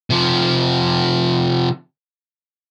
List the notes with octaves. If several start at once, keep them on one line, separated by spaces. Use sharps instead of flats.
C3 F3